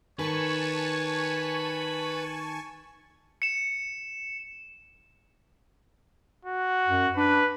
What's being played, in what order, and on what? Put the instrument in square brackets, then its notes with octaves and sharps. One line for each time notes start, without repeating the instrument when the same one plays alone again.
[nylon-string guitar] D#3 [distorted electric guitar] B4 [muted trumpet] C#5 [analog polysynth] G#5 A5 C#6
[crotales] C#7 E7
[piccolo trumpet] F#4
[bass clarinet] F#2
[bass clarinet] D4 [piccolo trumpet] B4